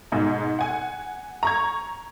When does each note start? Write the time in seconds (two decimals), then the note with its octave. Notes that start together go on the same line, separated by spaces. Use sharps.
0.12 G#2 B2 G#5
0.59 F#5 G#5
1.43 A#5 C#6 G#6